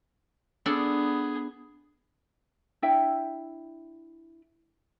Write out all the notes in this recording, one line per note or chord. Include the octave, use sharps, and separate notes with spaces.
B3 D4 G#4 A4
D4 E4 E5 G5